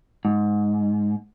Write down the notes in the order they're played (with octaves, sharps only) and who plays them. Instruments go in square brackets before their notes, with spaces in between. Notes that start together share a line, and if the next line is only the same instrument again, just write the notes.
[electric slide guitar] G#2